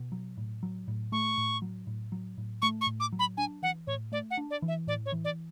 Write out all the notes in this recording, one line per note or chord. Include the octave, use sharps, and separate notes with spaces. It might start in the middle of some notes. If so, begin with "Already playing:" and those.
Already playing: B2
F#3
A2
F#3
A2
A3 C#6
A2
F#3
A2
F#3
A2
A3 C#6
C#6
A2
D6
F#3
B5
D4 G#5
E3 F#5
A2 C#5
A3 D5
F#5
D4
D5
E3
E5
A2 D5
C#5
E3
D5